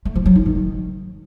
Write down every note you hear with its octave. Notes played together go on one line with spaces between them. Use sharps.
A3
F3
F#3
D#4
D#3